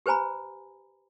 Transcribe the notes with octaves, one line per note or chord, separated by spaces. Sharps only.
G4 B4 C5 G#5 A#5 B5